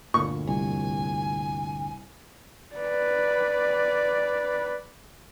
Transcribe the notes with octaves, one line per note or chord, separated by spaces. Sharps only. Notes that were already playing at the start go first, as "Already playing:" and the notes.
G1 D2 A#2 C#6
C2 G#5
B4 D5